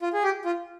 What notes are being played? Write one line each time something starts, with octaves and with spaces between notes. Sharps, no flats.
F4
G#4
G4
F4